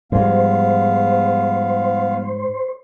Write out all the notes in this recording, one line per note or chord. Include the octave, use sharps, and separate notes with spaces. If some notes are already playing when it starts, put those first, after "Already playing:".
G#2 F3 G3 B3 C5 F5